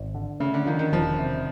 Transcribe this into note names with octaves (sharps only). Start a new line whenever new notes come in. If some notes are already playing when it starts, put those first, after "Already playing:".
Already playing: G#1
D3
C#3 A3
D3
D#3 F3
D#3
E1 F3
C3